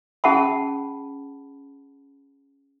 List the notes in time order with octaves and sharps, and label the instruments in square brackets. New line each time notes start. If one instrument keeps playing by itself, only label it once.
[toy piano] C#4 G#4 F#5 A5 B5